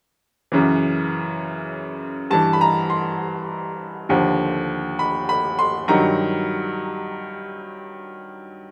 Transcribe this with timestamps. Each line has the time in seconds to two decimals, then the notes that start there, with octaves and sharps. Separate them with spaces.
0.52 F#2 C#3 E3
2.31 G2 E3 A5
2.53 B5
2.61 A#5
2.90 C6
4.09 D#2 D3 F3
4.99 B5
5.29 B5
5.59 C6
5.88 G2 D#3 F#3 A#5